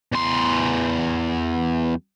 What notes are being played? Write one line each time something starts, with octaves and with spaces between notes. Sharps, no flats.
E2 C6